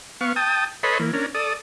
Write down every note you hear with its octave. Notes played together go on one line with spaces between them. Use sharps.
B3 F5 C#6
G5 A5 D#6
A4 B4 C#5 D#5 B5 C6
E3 A#3
C#4 D4 A#4
A4 D5 D#6